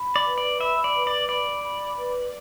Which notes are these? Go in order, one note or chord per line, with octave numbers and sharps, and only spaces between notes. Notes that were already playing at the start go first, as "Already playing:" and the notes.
Already playing: B5
D5
B4
D5
E5 B5
D5
B4
D5
D5 B5
B5
B4